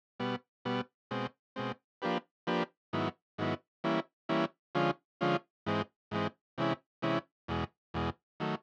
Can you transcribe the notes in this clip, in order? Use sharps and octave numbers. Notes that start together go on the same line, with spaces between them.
B2 G3 B3
B2 G3 B3
B2 G#3 C4
B2 G#3 C4
F3 A#3 D4 G4 B4
F3 A#3 D4 G4 B4
G#2 D#3 F#3 B3 E4
G#2 D#3 F#3 B3 E4
E3 G3 A#3 C#4 E4
E3 G3 A#3 C#4 E4
D3 F3 G#3 C#4 F4
D3 F3 G#3 C#4 F4
G#2 E3 G#3 C4
G#2 E3 G#3 C4
C3 E3 G#3 C#4 E4
C3 E3 G#3 C#4 E4
E2 B2 G#3
E2 B2 G#3
D#3 F#3 A3